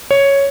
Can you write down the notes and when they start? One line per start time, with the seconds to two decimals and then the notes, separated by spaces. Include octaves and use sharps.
0.11 C#5